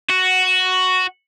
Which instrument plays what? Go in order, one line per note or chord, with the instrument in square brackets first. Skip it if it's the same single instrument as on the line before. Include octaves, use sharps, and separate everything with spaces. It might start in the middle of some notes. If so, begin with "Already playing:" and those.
[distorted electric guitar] F#4